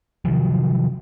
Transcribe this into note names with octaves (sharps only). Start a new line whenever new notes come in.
C3 D#3 F3 F#3